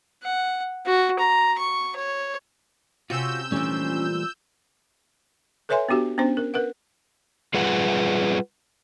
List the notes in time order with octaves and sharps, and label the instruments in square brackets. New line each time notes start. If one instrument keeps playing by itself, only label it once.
[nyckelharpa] F#5
F#4
A#5
C#6
C#5
[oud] C3 C#4 [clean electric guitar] F4 F#4 C5 [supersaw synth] E6 G6
[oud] A#2 F3 [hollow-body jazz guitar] E3 G3 A3 [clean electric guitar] C#4 D4
[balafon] A4 B4 C#5 E5 G#5 C6
B3 D4 F#4 G4
B3 C#4 D4 C5
A#4
A#4 B4 F#5
[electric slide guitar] G3 F4 G#4 B4 F#5